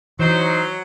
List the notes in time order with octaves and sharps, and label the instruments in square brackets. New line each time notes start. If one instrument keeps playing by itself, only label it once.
[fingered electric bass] E3 [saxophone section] F#3 [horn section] D#4 C5